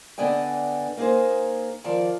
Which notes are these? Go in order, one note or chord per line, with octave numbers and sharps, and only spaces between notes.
D3 B3 D5 D#5 G5 G#5
A#3 D#4 G#4 C5
D#3 F3 D5